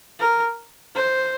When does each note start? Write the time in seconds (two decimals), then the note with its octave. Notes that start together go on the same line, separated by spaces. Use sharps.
0.19 A#4
0.95 C5